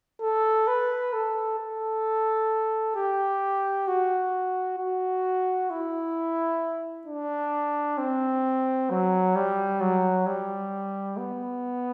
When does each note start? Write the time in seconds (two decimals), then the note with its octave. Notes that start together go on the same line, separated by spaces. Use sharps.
0.21 A4
0.67 B4
1.13 A4
1.59 A4
2.95 G4
3.88 F#4
4.78 F#4
5.70 E4
7.07 D4
7.98 C4
8.90 F#3
9.35 G3
9.81 F#3
10.26 G3
11.18 B3